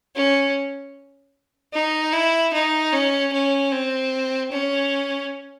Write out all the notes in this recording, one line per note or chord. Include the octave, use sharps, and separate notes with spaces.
C#4
D#4
E4
D#4
C#4
C#4
C4
C#4